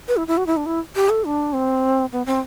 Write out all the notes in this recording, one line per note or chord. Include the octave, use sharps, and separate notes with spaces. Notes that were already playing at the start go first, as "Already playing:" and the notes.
B4
E4
E4
F#4
E4
D4
E4
G4
A4
D4
C4
B3
C4